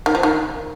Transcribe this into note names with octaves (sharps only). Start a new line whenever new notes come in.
D#3
F3
D#3